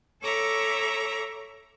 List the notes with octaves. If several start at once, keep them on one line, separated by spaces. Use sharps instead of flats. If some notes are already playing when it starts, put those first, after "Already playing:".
A4 C#5 E5 A#5 D6